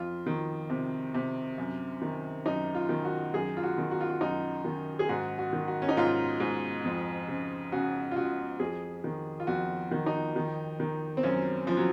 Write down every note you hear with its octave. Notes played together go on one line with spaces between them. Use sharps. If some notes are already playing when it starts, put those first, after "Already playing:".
Already playing: F2 F4
D#3
C3
C3
F#2
D#3
F#2 D#4
F4
D#3
F#4
F#2 G#4
F4
F#4
D#3
F#4
F4
F#4
F#2 D#4
D#3
G#4
G#2 F#4
F#4
D#3
F#4
C#4
D#4
G#2 F4
G#2
F2
C#3
C#3 F#4
F4
C#3 F#4
F2 G#4
D#3
F4
F2 F#4
D#3
D#4
D#3
D#3
C4
F#2 C#4
F#2 F3
F#3